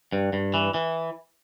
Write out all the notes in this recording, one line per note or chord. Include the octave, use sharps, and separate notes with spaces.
G2
G2
E3
E3